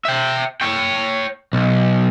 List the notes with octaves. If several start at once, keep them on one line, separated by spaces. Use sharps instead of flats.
E5 G5
C#5 G5
B1